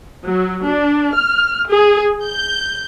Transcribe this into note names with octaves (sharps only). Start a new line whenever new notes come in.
F#3
D4
F6
G#4
G6